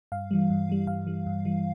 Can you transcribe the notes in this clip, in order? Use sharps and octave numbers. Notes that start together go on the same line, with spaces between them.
G2 F5
E3 G3
G2
E3 G3
G2 F5
E3 G3
G2
E3 G3